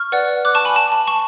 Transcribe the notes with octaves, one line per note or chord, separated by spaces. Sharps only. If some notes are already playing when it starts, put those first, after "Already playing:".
Already playing: C#6 F6
B4 D5 F#5
D6 F#6
A5 C#6
G#5 B5
A5
A5
A5 C#6